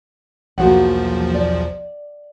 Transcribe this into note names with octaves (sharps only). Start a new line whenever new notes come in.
B1 E2 F3 A#3 F#4 F#5
D5